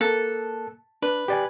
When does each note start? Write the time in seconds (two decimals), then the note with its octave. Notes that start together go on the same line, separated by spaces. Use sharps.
0.01 A#3 A4 F#6
1.02 D4 B4
1.28 G4 D5 G#5